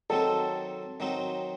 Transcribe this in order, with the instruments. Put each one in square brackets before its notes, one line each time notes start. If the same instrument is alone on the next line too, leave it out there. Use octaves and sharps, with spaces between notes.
[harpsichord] D#3 F#3 C4 D#4 [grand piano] A4
[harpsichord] D#3 F#3 C4 D#4